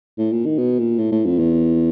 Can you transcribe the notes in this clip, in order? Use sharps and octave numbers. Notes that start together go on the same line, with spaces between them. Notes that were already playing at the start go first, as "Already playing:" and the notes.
A2
A#2
D#3
B2
A#2
A2
A2
F2
E2